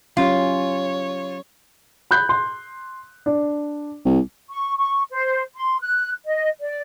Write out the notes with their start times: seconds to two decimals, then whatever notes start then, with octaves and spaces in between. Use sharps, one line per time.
0.17 F#3 C#4 F4 G4 C#5
2.11 B5 F#6 G6
2.29 C6
3.26 D4
4.05 C2
4.49 C#6
4.78 C#6
5.11 C5
5.55 C6
5.81 F#6
6.26 D#5
6.61 D5